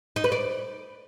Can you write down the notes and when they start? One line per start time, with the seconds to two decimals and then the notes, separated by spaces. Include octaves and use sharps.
0.16 D#4
0.24 B4
0.32 D5